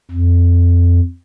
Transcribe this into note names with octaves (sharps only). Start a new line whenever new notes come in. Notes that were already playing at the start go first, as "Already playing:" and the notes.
F2